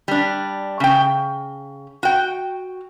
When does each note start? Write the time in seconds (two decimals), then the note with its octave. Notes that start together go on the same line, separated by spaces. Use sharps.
0.08 G3 D4
0.80 C#3 G5
2.03 F#4 G5